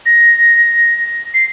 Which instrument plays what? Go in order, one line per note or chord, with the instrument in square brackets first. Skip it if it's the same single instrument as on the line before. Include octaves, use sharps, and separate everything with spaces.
[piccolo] A#6
C7